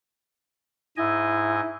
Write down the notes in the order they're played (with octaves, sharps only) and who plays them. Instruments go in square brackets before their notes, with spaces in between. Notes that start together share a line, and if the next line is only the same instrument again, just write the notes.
[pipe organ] G#2 D#5 G#5 [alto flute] E4